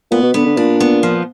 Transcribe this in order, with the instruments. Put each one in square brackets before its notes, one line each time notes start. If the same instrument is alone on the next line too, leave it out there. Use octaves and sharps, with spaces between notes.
[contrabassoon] A#2 [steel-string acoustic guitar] B3
[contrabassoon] B2
[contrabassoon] D3 [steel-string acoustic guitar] B3
[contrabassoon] D3
[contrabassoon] A#2 [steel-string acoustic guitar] D4
[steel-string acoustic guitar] B3
F3